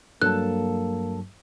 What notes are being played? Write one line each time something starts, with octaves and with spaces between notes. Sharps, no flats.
G2 F#3 A#3 A4 A5 F#6